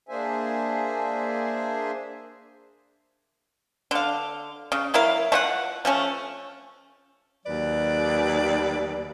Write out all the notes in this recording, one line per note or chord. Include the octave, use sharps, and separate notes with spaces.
A#3 D4 G#4 C5 E5 G#5
D3 F5
C#3
F#3 E4 A#4 F5
A3 F4 F#5
F3 A3 C#4
D#2 F#3 B4 D5